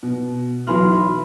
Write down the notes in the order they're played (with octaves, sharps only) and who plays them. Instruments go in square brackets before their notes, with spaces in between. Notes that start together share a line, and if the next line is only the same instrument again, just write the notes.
[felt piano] B2
[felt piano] B1 E3 F#3 [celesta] B5 C6 F6
[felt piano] E5